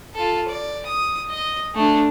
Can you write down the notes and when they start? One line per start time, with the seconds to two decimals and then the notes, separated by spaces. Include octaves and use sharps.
0.15 F4 A4
0.48 D5
0.86 D#6
1.30 D#5
1.75 A3 D4